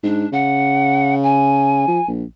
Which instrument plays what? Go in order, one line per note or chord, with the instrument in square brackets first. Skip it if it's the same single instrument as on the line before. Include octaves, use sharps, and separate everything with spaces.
[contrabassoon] G#2 [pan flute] D4
[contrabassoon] C#3 [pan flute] F#5
[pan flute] G#5
[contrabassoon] F3
A#1